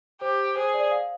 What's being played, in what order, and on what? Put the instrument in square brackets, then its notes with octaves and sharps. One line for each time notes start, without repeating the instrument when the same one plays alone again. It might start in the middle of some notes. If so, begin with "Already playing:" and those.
[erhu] G4 [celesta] C5
[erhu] G#4 [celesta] C5
[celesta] D5
F5